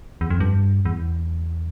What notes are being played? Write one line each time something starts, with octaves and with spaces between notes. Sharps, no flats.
E2
F2
G2
E2